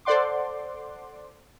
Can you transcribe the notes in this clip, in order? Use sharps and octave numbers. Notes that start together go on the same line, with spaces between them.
A4 C5 D5 F#5 C6 D6